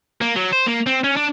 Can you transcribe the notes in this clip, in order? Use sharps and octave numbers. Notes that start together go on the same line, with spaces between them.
A#3
F#3
C5
A#3
C4
C#4
D4